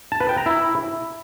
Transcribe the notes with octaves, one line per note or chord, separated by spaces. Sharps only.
A5
B4
G5
A#5
E4